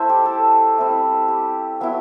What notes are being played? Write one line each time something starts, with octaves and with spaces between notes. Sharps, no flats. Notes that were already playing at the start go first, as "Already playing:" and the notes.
Already playing: A3 E4 C5 E5
G4
A4
G3 C4 E4
G4
F#3 B3 E4